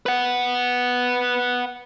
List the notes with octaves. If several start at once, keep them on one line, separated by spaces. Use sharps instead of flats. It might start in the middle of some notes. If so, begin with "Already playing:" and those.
B4 F#5